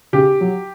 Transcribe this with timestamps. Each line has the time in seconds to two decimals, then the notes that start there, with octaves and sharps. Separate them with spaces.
0.13 C#3 G4
0.41 F#3